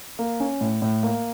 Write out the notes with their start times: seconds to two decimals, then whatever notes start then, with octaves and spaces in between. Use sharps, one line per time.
0.19 A#3
0.40 C#4
0.61 A2
0.82 A2
1.03 A#3